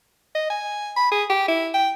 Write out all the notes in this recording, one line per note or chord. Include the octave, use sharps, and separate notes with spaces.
D#5
G#5
B5
G#4
G4
E4
G5